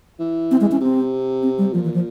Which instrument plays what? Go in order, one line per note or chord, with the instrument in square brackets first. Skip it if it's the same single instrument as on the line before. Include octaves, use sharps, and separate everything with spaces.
[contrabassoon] E3
[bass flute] C4
G#3
C#4
[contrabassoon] C3 [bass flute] C4
[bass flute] C4
G3
[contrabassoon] A#2 [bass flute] F3
[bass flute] E3
F3